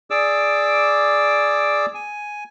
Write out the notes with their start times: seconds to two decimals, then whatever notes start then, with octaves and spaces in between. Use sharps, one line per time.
0.10 G#4 D5 D6 E6
1.94 G#5